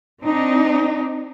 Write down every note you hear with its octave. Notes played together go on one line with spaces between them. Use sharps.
C4 D4 D#4